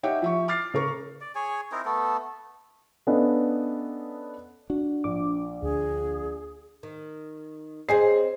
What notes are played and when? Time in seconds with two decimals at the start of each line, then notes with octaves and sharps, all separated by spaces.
0.03 D#4 G4 C#5 E5 F#5 G5
0.22 F3 E5 C#6
0.48 D6 F6 A6 C7
0.73 C#3 A#4 C#6
1.21 D5
1.35 G#4 C#5 G#5
1.72 C4 D#4 E4 A#4
1.85 A3 B3 A4
3.07 B3 C#4 D4 A4 D#5 F5
4.70 D4 F#4
5.04 A#1 D6
5.62 D2 G#4
6.83 D#3
7.89 C4 G#4 C#5 D#5 C7